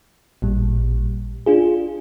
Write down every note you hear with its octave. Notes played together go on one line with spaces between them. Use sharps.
A1 A#2 G3
D4 F4 G#4